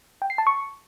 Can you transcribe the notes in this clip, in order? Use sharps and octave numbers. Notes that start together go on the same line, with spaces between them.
G5
C7
A5
C#6